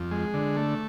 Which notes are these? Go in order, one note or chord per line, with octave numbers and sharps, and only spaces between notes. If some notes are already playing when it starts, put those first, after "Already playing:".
Already playing: F2
G#3
D3
A3